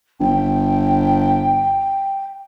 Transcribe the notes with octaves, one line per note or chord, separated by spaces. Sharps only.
G1 G5